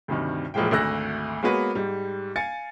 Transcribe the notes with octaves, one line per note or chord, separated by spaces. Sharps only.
D2 G2 C3 D#3
E1 A2 F3 G#3 A#3 G5
G#1 D2 A3 E6 F#6 A#6
G#3 A#3 B3 F#4 B4 C#5
G#2 G3
F5 G#5 A6 C#7